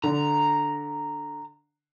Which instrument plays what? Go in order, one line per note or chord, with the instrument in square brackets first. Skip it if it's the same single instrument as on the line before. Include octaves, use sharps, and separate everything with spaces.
[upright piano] D3 [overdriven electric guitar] A#5